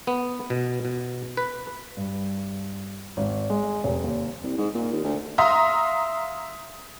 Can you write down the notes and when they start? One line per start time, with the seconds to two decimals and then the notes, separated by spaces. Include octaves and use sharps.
0.07 B3
0.50 B2
0.85 B2
1.37 B4
1.97 G2
3.17 G#1
3.50 G#3
3.84 F1
4.04 D#2
4.43 C2
4.57 G#2
4.74 A#2
4.93 D#2
5.04 D2
5.38 E5 F5 A#5 C6 D#6